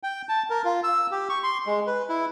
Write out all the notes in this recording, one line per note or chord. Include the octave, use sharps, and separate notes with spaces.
G5
A5
A#4
F4
E6
G4
C#6
C6
G#3
B4
E4